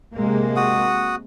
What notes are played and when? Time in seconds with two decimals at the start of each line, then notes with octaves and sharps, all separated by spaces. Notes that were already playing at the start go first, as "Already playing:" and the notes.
0.15 C3 G#3 A#3
0.56 F#4 F#5 D#6